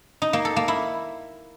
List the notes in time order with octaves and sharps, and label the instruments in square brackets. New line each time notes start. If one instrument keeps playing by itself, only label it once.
[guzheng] D#4
A#3
A4
A#3
E4